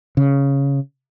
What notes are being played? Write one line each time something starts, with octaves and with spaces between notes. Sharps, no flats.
C#3